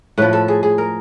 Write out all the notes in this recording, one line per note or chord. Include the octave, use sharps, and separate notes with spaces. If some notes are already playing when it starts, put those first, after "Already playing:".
A2 F3 B4
A4
G#4
G#4
A#4